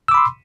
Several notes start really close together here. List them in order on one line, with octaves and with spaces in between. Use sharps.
E6 D6 B5 C6